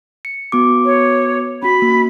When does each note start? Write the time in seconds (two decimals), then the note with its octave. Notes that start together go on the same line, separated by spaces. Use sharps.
0.25 C#7
0.52 B3 F#4 D6
0.85 C#5
1.63 C#4 F#4 B5
1.82 A#3